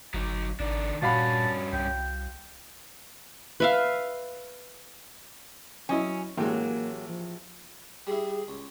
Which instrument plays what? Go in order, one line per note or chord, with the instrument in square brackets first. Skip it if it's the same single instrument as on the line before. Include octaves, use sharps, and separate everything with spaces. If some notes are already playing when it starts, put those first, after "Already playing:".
[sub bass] G1 [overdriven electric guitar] F#3 D#4
[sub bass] G#1 [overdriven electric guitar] D#3 D4
[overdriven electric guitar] G2 C#4 [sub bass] A#2 [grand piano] F#4 F5 B5 [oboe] A5
[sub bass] C2 [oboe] G5
[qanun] B4 E5 F5
[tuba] F#3 [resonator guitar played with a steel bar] C#4 [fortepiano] E4 D#5 G#5
[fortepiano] A1 G#3 [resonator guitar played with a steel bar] F#3 G4 [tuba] A#3
[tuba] F3
[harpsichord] G3 E4 [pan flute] G#4
[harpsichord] C#2